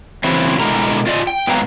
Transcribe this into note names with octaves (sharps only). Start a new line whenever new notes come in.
C#3 E3 C4 E4 F#4 C5
B2 D3 G#3 E4 A#4 A#5
F4 D5 D#5
G5
G#2 F#3 B3 B4 F5 A#5